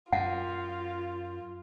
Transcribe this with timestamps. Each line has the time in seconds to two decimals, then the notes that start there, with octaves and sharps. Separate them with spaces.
0.12 F#2 F4 F#5